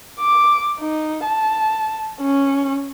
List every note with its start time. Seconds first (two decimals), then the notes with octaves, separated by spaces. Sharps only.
0.20 D6
0.80 D#4
1.25 A5
2.21 C#4